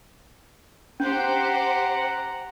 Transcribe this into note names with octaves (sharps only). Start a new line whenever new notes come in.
C#4 G4 C5 F#5 A#5